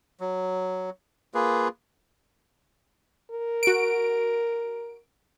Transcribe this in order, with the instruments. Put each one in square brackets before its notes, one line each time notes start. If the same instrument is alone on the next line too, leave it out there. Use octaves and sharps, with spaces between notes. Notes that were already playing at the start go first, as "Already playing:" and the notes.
[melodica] F#3
A#3 F4 G#4 B4
[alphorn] A#4
[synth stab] F#4 D7